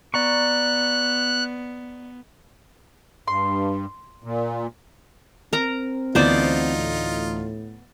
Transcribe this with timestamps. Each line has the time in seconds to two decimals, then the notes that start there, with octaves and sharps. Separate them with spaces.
0.14 B3 D5 A#5 C#6 F#6
3.28 G2 C6
4.24 A#2
5.53 C4 A#4 A#5
6.15 D2 E3 B3 D#4 F4 C5 D5 A6
6.78 A2